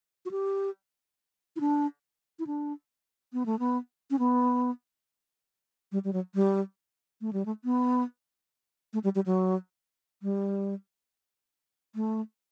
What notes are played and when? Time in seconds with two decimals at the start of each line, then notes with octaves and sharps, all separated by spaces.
0.25 F#4
0.31 G4
1.56 E4
1.60 D4
2.39 E4
2.47 D4
3.33 B3
3.46 A3
3.59 B3
4.11 C#4
4.19 B3
5.92 G3
6.04 G3
6.13 F#3
6.35 G3
7.21 A3
7.33 G3
7.46 A3
7.65 B3
8.93 A3
9.04 G3
9.15 G3
9.26 F#3
10.23 G3
11.95 A3